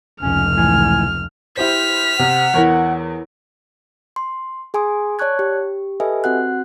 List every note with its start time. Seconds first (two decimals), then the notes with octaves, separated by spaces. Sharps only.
0.22 F1 C#2 C#4 F6
0.58 A2 E3 G#5
1.57 E4 G4 C5 F6 B6
2.19 C3 C4 F#5
2.54 E2 E4 A#4 C#5
4.16 C6
4.74 G#4 G#5 C6 D#6
5.19 C#5 D5 A5 C#6 F#6 G#6
5.39 G4
6.00 G4 A4 B4 D#5 E5 G#5
6.24 C4 F#4 F#5 F#6